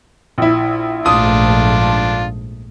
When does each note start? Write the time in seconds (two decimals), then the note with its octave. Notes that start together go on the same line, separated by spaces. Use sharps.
0.38 A#1 E4
1.06 A#1 G#2 A3 D4 F4 D#6